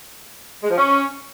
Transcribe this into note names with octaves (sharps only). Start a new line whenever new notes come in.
G#3
F3
C#4